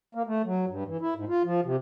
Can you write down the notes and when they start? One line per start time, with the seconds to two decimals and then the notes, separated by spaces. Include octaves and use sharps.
0.15 A#3
0.27 A3
0.45 F#3
0.69 G2
0.87 E3
1.01 E4
1.16 G#2
1.29 F4
1.44 F3
1.65 C3